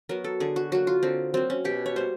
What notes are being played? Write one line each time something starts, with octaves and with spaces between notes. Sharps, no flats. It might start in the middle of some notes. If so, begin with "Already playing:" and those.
F#3 B3 A#4
A4
D3 G#4
F#4
F#3 A#3 F#4
F4
D3 C4
F#3 A#3 C4
C#4
B2 G4
C#5
G3 A#3 C5